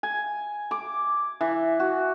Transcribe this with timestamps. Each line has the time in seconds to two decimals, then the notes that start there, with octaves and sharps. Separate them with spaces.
0.03 G#5
0.71 D6
1.41 E3
1.80 F#4